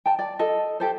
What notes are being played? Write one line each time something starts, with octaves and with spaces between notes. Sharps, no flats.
G5 A5
D5
A4 D#5
G4 A4 C5